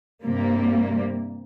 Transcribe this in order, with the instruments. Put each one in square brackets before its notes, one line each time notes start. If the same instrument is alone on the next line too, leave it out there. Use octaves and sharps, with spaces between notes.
[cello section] G2 C3 G3 A#3